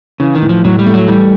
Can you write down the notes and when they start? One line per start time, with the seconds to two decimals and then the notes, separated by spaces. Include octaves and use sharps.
0.20 C#3 E3
0.35 D#3
0.42 A2
0.49 F3
0.65 A2 F#3
0.79 G3
0.86 A3
0.94 F#3
1.08 E3 G3